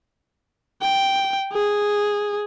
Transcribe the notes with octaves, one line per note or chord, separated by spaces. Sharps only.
G5
G#4